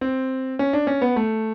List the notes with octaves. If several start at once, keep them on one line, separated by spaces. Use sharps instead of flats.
C4
C#4
D4
C#4
B3
A3